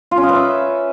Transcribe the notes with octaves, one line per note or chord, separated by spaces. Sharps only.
F4
C#4
D#5
B4
E5